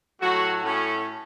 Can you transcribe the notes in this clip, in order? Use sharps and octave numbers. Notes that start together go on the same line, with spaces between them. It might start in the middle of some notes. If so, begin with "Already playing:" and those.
A2 F#3 A3 F#4
A2 A3 C#4